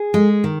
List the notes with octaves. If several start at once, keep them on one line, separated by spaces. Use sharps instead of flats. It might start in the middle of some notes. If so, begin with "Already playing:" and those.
Already playing: G#4
G#3
D#3